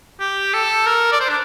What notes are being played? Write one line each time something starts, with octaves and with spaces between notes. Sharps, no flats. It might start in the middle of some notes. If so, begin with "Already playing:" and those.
G4
A4
A#4
D5
C5
D4